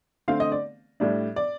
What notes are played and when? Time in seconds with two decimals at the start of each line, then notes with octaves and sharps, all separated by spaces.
0.28 D3 A3 C4 F5
0.40 D#5
0.52 D5
1.00 A2 G3 D4
1.36 D5